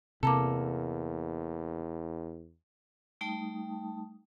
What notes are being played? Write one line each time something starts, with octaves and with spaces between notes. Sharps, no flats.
E2 C3 A#3 A4 A5 A#5 D6
G3 A3 D#4 G5 A5 D#6